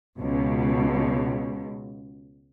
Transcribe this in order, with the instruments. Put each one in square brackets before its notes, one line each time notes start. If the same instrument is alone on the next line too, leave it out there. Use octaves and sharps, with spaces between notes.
[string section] C#2 B2